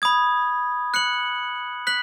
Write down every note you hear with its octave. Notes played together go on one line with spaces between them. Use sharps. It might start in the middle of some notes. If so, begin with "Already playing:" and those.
B5 D#6 G#6
F#6 C#7 F#7
F#6 B6 F#7